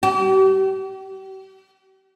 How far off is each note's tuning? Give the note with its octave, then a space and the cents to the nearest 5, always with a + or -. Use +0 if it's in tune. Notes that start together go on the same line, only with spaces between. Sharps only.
G4 -40